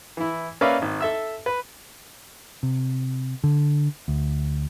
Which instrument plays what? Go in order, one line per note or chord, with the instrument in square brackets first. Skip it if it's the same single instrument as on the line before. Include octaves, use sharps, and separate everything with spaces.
[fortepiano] E3 E4
A#3 C#4 B4 D5 E5 F5
G#1
A4 E5 E6
B4
[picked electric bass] C3
D3
D2